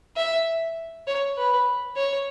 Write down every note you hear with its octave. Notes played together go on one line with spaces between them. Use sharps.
E5
C#5
B4
C#5